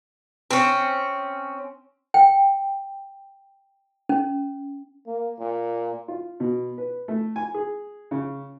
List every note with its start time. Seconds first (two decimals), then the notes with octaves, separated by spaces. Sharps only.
0.51 C4 C#4
2.14 G5
4.09 C#4
5.06 A#3
5.39 A#2
6.08 F4
6.40 B2
6.78 B4
7.08 A3
7.36 G#5
7.54 G#4
8.11 C#3